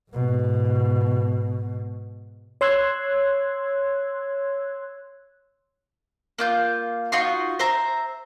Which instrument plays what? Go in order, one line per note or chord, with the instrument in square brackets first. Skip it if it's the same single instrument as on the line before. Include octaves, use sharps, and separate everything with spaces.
[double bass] G#2 B2
[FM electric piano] C#5 C6 E6 F#6 G#6
[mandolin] A#3 F4 G6
D#4 F4 F#4 C6
C5 E5 A#5